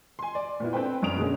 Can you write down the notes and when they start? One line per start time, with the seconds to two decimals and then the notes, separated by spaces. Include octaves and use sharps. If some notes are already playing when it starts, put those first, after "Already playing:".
0.19 G#5 C6
0.35 D5
0.60 A#2 B3 E4
0.73 C4 D4 A4 B4 C5 G5
1.02 F#2 D4 D#6 D7 F7
1.17 B2 D3 G#3 A#3 C#4